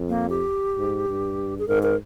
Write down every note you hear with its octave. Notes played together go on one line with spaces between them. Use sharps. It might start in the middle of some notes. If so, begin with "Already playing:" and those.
Already playing: F2
A#3
G4
G#2
G2
G#4
G#2 A#4
A#4